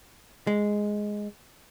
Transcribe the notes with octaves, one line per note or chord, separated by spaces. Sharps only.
G#3